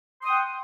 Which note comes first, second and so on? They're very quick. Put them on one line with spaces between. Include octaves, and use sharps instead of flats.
C6 D#6 G5 F#5